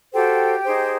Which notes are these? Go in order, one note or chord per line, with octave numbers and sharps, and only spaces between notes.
F#4 G4 A4 C5 G5
D#4 G#4 C5